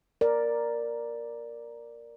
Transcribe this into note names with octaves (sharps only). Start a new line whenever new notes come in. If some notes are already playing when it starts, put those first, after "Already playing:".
A#4 D5